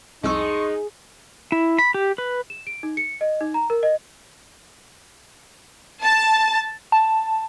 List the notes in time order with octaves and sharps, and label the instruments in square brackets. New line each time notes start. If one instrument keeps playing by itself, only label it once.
[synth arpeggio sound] C2 F2 E6 [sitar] G#3 [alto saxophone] D#4 [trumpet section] A5 C6 C#6
[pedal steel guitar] E4
B5
G4
B4
[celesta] E7
D7
D#4
C#7
D#5
D#4
A#5
A#4
D#5
[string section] A5
[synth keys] A5